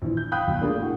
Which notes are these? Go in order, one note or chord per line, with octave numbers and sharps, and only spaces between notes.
A#1 E3
G6
F5 G5 B5 D#6 F#6 G6
B1
A3 A#3 D4 F4 G#4
A2 F#4